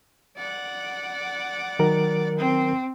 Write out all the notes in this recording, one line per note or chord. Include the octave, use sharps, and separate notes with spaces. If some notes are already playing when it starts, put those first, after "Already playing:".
D5 F#5
D#3 F#3 A#4
C4